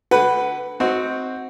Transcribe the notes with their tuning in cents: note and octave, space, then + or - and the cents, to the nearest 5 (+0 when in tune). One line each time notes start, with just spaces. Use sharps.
D3 +0 B4 +0 F#5 +20
C4 +0 D#4 +20 F#4 +0